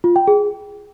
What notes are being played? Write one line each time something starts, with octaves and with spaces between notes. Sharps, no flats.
F4
G5
G#4